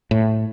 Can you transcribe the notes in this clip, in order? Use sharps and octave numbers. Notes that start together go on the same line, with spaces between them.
A2